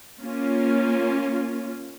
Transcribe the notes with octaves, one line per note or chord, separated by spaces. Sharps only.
A#3 C#4 F4